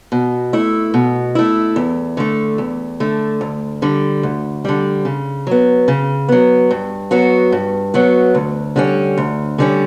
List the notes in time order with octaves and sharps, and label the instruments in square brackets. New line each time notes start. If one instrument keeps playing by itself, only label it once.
[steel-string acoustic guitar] B2
A3 E4
B2
A3 E4
E2
D3 A3
E2
D3 A3
D2
D3 G3
D2
D3 G3
C#3
F#3 B3
C#3
F#3 B3
G2
F#3 B3 F#4
G2
F#3 B3 F#4
D2
D3 G3 C#4
D2
D3 G3 C#4